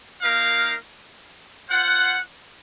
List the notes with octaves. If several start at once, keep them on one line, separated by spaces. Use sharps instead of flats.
A#3 D#4 A#4 F5
F4 C5 F#5